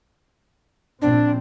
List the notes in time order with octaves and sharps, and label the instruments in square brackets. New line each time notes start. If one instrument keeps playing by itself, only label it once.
[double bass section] A#1 C4 [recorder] D4